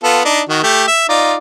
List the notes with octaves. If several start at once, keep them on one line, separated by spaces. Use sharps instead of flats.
B3 F4 A4
D4 D#4
D#3 F#4
A3 G4
E5
D#4 F4 D5